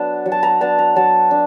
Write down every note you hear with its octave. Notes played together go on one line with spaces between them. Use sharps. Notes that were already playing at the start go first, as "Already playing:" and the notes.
Already playing: F#3 B3 D4 A5
F#3
A5
A#5
B3 D4 A5
A#5
F#3 A5
D4